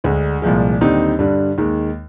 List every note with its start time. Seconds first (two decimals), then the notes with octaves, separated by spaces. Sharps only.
0.04 D2 D3 G#3
0.42 C2 A#2 F3 G#3
0.81 D#2 D3 G3 C4 D#4
1.19 G2 D3 G3
1.58 D#2 D#3 G#3